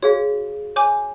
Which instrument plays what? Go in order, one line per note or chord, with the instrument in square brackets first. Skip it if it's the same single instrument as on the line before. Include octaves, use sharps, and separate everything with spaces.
[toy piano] F#4 G#4 F5 [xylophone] C#5
[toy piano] C#5 [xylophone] G#5 D6 G6